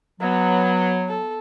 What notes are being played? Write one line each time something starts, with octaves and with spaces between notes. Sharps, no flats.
F#3 B3
A4